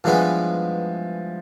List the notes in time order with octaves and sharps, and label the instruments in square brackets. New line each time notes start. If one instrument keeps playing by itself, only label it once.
[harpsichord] G2 E3 G#3 B3 [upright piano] F3